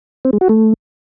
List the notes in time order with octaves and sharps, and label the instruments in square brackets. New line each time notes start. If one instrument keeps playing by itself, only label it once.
[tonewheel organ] C4
G#3
F#4
A3